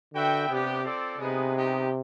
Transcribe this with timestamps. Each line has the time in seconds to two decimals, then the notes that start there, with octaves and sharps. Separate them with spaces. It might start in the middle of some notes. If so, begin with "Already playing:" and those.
0.14 D3 F#4 B4 E5 G5
0.48 C3 B3 D4 G4
0.84 C4 F4 A4 D5
1.18 C3 G#3 B3 D#4 G#4 B4
1.52 G#3 B3 D#4 G4